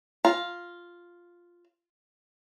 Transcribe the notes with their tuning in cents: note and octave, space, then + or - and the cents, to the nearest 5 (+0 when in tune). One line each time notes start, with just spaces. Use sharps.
F4 +0 A#5 +15